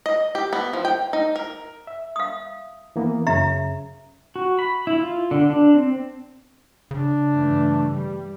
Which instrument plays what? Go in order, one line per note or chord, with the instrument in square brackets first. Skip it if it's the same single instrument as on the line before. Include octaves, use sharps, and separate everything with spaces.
[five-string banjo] D#5
G4
B3
F3
G5
D#4
A#4
[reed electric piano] E5
[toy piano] F5 D#6
[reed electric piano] E3 A#3 B3
[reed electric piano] F#2 C#3 [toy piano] E5 A#5
[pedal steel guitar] F#4
B5
E4
F4
D3
D4
C4
[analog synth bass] C#3 [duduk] D4
[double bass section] G2 E3 A3
G3